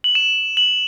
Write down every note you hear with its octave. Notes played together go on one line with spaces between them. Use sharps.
F#7
E7
F#7